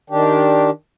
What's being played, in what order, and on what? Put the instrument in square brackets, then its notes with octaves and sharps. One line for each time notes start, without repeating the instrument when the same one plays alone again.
[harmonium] D#3 D4 G4